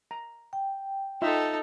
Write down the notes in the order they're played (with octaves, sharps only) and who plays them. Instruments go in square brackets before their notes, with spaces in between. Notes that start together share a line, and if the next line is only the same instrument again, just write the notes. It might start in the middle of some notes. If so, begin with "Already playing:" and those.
[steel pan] A#5
[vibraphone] G5
[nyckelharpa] D#4 A4 [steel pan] F4 E5